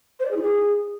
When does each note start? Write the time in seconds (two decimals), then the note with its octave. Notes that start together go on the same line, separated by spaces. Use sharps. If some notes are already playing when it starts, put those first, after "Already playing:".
0.20 C5
0.25 D5
0.31 G#4
0.36 E4
0.42 G#4